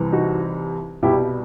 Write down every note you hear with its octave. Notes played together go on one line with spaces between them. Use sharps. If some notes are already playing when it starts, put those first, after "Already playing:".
Already playing: C2 C3 E3
D#4 F#4
C2 B2 G3 E4 G4